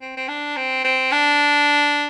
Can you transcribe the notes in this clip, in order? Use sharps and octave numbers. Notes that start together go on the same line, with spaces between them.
C4
C4
D4
C4
C4
D4